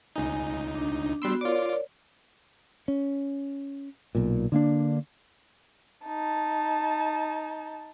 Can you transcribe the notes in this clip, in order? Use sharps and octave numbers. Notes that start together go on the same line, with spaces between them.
C#2 D#4 G#5
D4
G3 B3 F#4 C6 E6
F4 A#4 C#5 D5 D6
C#4
B1 A#2
D3 A#3 D4
D#4 A5